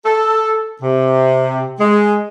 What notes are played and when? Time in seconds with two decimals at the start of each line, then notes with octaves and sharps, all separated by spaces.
0.05 A4
0.82 C3
1.79 G#3